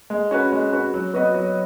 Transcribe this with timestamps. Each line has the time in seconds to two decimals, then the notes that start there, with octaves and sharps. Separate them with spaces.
0.10 G#3
0.31 C#4 F#4 B4
0.52 G#3
0.73 C#4 F#4 B4
0.94 F#3
1.13 B3 F#4 B4 D#5
1.34 F#3